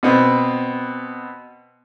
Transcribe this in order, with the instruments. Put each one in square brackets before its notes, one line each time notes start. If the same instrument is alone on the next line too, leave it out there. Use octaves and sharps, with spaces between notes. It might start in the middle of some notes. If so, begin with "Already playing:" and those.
[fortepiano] B2 B3 C4